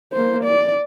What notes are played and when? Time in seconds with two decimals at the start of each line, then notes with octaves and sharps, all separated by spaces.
0.13 A#3 C5
0.44 D5